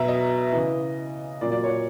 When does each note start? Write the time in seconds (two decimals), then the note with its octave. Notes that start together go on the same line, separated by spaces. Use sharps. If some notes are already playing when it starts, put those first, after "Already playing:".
Already playing: B2 F#3 E5 A#5
0.08 D#5
0.52 C#3 E3
1.41 A#2 F#3 D5
1.52 D5
1.64 C#5